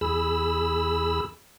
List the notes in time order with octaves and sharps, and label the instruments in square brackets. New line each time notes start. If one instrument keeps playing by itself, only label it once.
[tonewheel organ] E2 G#4 B5 E6